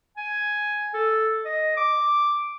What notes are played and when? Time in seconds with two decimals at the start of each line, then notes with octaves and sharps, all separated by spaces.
0.17 G#5
0.94 A4
1.45 D#5
1.77 D6